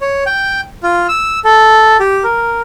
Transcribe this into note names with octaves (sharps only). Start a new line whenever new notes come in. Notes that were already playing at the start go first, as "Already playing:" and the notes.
C#5
G5
F4
E6
A4
G4
A#4